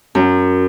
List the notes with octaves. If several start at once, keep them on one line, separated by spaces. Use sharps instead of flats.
F#2